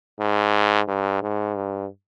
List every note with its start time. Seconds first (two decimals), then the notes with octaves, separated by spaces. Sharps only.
0.19 G#2
0.88 G2
1.22 G#2
1.56 G2